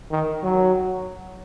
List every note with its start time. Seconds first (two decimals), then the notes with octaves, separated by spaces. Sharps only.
0.11 D#3
0.43 F#3